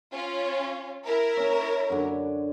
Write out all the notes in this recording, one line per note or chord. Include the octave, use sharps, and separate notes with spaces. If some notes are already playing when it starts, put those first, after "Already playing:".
C#4 F4
E4 A#4
C#4 C#5
F#2 D3